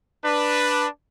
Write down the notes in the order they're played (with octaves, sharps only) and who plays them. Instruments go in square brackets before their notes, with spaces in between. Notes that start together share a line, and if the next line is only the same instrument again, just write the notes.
[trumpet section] D4 B4